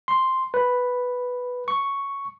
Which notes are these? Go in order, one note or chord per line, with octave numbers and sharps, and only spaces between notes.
C6
B4
C#6